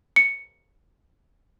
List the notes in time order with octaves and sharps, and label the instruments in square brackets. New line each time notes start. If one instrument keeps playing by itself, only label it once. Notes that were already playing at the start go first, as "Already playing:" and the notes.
[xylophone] C#7